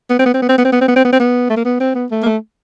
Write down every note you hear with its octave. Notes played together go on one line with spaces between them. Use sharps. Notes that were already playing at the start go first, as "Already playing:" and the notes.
B3
C4
B3
C4
B3
C4
B3
C4
B3
C4
B3
C4
B3
C4
B3
A3
A#3
B3
C4
B3
A3
A#3
A3